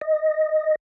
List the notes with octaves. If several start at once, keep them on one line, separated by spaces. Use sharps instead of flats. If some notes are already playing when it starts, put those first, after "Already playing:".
D#5